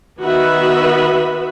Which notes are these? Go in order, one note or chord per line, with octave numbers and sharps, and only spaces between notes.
D#3 B3 F#4 B4 E5 B5